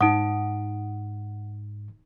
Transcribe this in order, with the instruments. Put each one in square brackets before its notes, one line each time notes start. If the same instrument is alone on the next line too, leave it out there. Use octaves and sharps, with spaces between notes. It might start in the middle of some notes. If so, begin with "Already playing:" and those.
[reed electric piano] G#2 [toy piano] D#4 D#6 [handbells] F#5 D7